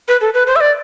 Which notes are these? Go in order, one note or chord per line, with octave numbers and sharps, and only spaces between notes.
B4
A4
B4
C5
E5
D5